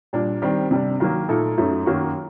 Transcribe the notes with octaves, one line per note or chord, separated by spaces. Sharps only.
A#2 G3 D4
D#3 G3 C4 G4 D5
C3 G3 D4
D#3 F#3 A#3
A#2 A3 D#4 A4
F#2 F#3 A3 D#4
F#2 D#3 F#3 A#3 F#4